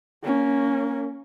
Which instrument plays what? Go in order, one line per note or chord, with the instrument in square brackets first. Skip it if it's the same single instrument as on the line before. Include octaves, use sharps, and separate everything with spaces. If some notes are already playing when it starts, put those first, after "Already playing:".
[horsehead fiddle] A#3 C#4